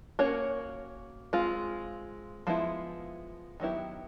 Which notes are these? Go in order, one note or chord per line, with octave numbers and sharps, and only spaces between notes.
A#3 C#4 F#4 A#4 C#5
G#3 C4 F4
F3 G#3 B3 E4
D#3 F#3 B3 E4 G4